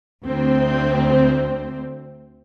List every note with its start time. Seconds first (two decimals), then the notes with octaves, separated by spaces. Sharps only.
0.24 D2 C4